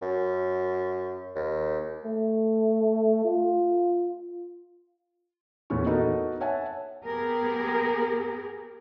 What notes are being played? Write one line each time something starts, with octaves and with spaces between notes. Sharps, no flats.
F#2
D#2
A3
F4
E2 A#2 C#4 E4 C#6
B3 D#4 F#4 A4 A#4
C#5 E5 F#5 G#5 A5
B3 G4 G#4 A#4